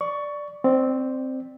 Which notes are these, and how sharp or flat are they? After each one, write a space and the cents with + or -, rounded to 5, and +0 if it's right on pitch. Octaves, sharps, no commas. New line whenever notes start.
D5 +0 C#6 +15
C4 +0 D5 +20